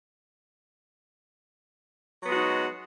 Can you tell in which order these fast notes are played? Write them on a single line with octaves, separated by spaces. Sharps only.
F#3 B3 G#3 F#4 D#4